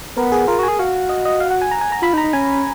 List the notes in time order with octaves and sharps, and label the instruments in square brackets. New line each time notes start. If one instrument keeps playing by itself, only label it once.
[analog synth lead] B3 [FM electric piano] A#4
[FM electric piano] G#4
[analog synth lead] F4 [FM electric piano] A#4
[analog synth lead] F#4
[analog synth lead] G#4 [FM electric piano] G#5
[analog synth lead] F#4 [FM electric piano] F5
[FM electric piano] D#5
D#5
F5
F#5
G#5
A#5
G#5
A#5
[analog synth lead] F4 [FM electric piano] B5
[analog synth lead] D#4
[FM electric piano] A#5
[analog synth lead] D#4
[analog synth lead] C#4 [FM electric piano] G#5